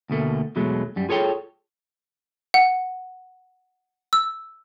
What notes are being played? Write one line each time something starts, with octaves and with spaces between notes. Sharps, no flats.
D2 B2 A3 A#3
E2 B2 F#3 G#3 A3
F#2 G3
F4 G#4 A4 C#5 G5
F#5
E6